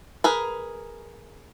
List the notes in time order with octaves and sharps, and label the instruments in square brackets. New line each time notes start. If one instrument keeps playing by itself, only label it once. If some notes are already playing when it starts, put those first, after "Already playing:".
[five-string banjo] G#4 A#4 B4